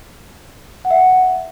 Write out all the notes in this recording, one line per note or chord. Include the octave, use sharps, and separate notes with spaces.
F#5
E5
F#5